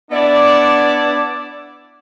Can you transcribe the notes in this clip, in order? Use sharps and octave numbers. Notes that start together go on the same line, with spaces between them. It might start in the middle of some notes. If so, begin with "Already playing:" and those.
B3 D4 E4 D5